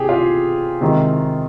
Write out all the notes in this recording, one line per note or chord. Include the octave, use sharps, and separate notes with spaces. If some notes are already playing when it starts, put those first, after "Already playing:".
Already playing: C3 G4 G#4
F4
C3 D#3 G#3